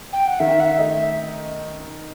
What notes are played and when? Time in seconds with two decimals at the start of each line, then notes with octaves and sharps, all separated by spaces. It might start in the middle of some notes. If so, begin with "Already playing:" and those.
0.12 G5
0.27 F#5
0.39 D#3 E5
0.60 F#5
0.65 E5
0.78 A3 D#4
0.90 E5